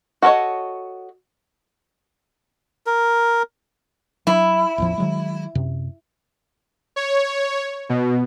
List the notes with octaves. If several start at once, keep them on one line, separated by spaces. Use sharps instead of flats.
F#4 A4 A#4 C#5 D#5
A#4
F#3 E4
A1 E2 F3
D#3 F#3 G#3
F#2 C3
C#5
B2